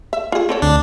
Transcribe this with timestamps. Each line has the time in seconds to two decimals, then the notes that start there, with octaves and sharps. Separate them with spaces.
0.13 E5
0.32 F4 G#4
0.49 C4 A4 C#5
0.62 D2 D4